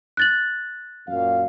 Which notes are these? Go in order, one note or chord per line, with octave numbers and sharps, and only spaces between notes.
F#6 A6 F#7
F#2 A#2 F5